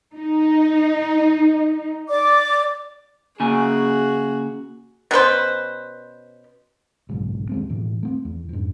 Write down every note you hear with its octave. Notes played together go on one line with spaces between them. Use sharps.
D#4
D5 D6
C#3 A#3 F#4 G#4 G#5
B2 C#4 B4 C5
F#1 B1 G#2
D#2 G#3 C4
E1 A2 E3
A3 C4
E2
F2 G#2